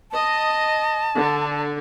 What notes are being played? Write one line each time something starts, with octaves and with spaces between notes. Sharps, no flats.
D#5 A5
D3